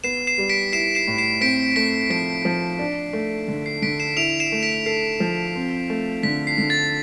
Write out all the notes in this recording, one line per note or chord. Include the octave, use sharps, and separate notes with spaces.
B3 C7 E7
C7 E7
G3
B6 D7
E4 C7 E7
C7 E7
A2
C7 E7
C4 B6 D7
A3 B6 D7
F3 B6 D7
F3
D4
A3
D3
C7
D3 B6 D7
C7 E7
E4 D7 F7
C7 E7
A3
B6 D7
A4 C7
F3
C4
A3
D3 B6
C7
D3
A6